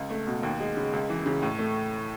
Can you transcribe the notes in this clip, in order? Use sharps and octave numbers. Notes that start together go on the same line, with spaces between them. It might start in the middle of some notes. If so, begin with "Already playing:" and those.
Already playing: C#2
A3
B2
D#2
G#3
C#3
C#2
E3
C#3
A2
A3